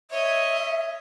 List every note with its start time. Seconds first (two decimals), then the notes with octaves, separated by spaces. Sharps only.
0.11 C#5 D#5 E5